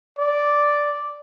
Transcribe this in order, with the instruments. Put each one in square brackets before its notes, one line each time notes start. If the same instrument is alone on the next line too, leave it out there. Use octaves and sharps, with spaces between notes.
[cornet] D5